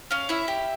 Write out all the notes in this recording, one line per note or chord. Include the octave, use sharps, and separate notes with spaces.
C#4 F5
E4 E5
G4